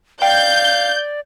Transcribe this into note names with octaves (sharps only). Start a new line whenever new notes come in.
D5 F5 G5 G6